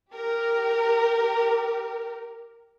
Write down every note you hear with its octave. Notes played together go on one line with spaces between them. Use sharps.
G4 A#4